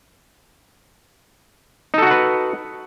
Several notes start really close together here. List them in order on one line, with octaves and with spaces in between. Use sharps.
D#4 A4 F#4 F#5 B4